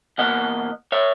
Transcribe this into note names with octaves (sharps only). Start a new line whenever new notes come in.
E2 B2 A#3 D#5 F#5
C#5 E5